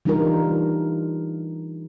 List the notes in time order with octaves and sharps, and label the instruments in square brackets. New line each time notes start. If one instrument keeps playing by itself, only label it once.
[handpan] E3 G3 D4 D#4 F4 A#4